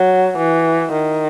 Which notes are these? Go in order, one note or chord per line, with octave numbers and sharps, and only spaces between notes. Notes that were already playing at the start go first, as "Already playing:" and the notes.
Already playing: F#3
E3
D#3